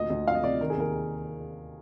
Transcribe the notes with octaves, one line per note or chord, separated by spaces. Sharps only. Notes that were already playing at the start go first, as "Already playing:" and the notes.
Already playing: D2 A#2 D#5
D2
F3 F5
D#5
C3 D5
D#3 A#4
G#4
D#2 A#4